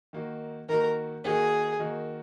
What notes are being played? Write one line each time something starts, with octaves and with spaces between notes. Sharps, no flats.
D#3 A#3 D#4 F#4
D#3 A#3 D#4 F#4 A#4
D#3 A#3 D#4 F#4 G#4
D#3 A#3 D#4 F#4